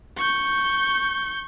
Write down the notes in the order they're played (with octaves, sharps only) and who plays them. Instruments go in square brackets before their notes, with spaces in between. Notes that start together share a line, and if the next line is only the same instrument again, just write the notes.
[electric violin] C#6 G6